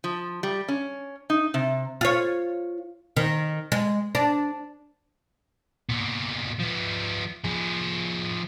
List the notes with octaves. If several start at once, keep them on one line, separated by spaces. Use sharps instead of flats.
F3
G3
C#4
D#4
C3
F4 C#5
D#3
G#3
D4
A#2 B3
F3 B3
F3 G#4